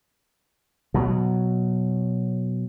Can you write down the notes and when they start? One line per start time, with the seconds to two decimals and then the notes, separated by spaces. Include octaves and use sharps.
0.94 B2 F#3